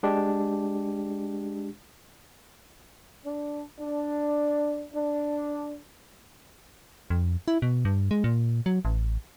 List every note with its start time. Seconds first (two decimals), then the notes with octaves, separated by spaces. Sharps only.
0.03 G#3 D4 G4
3.25 D4
3.79 D4
4.93 D4
7.10 F2
7.48 E4
7.62 B2
7.85 G2
8.11 G#3
8.24 A#2
8.66 F#3
8.85 A1